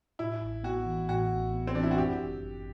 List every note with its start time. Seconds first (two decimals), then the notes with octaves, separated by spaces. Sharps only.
0.19 A2 E4
0.42 A1
0.63 B3 F#4
0.86 E3
1.09 A2 F#4
1.31 A1
1.54 B3
1.67 C4
1.75 E3 D4
1.83 E4
1.91 F#4
1.98 F#2 G4
2.21 G1
2.42 G1